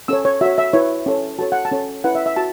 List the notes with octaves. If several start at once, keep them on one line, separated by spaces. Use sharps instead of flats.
C#4 A4 C#5 E6
C#5
F#4 C#5 E5
E5
E4 B4 C#5
C#4 A4 C#5
F#4 A4 C#5 A5
F#5
A5
C#4 A4 C#5
C#4 E4 B4 F#5
E5
E5
F#4 A5